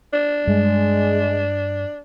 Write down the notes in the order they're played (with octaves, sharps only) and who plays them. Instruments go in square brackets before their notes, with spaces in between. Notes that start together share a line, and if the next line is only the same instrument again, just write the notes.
[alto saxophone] D4
[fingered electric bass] G2 G3 [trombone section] G#3